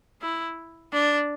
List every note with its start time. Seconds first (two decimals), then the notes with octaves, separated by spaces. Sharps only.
0.22 E4
0.93 D4